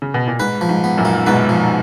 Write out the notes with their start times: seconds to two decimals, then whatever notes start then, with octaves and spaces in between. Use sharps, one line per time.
0.02 C#3
0.14 B2
0.28 A#2
0.40 G#2 B4
0.61 F3
0.69 G#2
0.84 B3
0.97 F#2 A#2
1.05 F4
1.26 G#2 B2 B4
1.49 F3